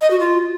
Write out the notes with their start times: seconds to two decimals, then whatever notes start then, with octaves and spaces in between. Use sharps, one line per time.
0.01 D#5
0.11 F#4
0.20 F4